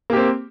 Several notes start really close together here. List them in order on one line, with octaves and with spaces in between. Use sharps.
A#3 G4 C4